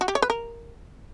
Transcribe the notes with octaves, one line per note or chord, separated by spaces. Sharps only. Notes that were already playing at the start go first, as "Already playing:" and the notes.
F#4
G4
C#5
B4
A#4